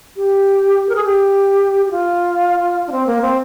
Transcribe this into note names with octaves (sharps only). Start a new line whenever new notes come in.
G4
A#4
G#4
G4
G4
F4
D4
C4
A#3
C4